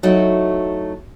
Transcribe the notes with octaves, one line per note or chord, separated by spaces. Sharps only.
F#3 A3 D#4 E4 F#4